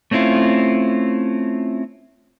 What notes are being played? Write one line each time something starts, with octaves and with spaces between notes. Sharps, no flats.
A3 C4 C#4 E4 F4